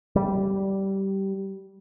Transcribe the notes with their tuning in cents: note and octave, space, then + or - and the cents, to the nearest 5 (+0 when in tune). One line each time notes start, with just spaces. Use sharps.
G3 -15